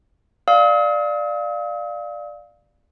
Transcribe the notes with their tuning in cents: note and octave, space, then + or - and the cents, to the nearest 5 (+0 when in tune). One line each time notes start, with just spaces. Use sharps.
D5 +10 F5 +0 D#6 +45